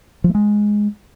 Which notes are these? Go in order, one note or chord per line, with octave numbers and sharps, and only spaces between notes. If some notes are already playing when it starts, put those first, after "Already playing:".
F3
A3
G#3